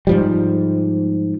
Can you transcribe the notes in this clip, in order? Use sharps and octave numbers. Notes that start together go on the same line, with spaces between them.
G#2 F3 G3